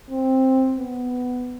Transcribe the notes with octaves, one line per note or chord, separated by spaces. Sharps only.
C4
B3